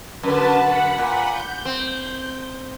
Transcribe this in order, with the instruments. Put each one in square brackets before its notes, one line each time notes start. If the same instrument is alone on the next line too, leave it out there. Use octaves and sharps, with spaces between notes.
[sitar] F#2 D3 [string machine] B4 A5
[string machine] F#5 B5
[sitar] A#2
[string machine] G6
[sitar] C4